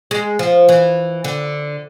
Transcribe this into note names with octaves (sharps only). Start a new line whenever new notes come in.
G#3
F3
E3
D3